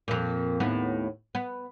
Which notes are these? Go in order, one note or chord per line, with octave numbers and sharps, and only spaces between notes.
F2 A#2
D#2 A2 B3
B3